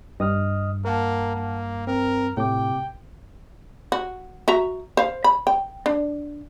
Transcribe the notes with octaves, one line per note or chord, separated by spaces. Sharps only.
G2 D#5 D#6 F6
A#3 A#4 F#5 A5
A#3
C4 A#4
A2 C3 G5 D6
F#4
F#4 E5 A#5
C5 F5
B5
G5
D4